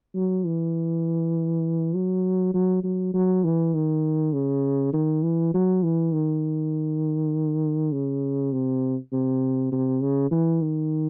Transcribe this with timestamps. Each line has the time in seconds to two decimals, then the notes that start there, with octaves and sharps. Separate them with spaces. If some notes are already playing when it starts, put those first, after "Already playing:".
0.15 F#3
0.46 E3
1.95 F#3
2.54 F#3
2.84 F#3
3.14 F#3
3.44 E3
3.74 D#3
4.33 C#3
4.93 D#3
5.23 E3
5.54 F#3
5.83 E3
6.12 D#3
7.92 C#3
8.52 C3
9.13 C3
9.72 C3
10.02 C#3
10.31 E3
10.61 D#3